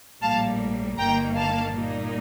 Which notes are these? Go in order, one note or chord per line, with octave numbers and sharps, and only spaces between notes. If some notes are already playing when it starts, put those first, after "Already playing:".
A#1 A2 G3 A#3 F5 A5
G1 G2 D#3 A#3 G5 A#5
F5 A5
A#2 G3 A#3 D#4